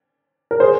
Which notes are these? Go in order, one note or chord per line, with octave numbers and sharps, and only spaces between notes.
A#4
G#4 C5